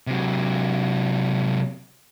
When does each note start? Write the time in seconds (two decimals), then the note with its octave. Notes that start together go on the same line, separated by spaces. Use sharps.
0.07 C3 F#3